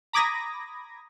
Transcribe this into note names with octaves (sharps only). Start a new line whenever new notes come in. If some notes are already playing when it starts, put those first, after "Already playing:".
A#5 B5 D6 D#6 G#6 A#6